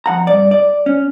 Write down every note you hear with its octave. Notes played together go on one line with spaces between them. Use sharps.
F2 F#5 A#5
G2 D5
D5
C#4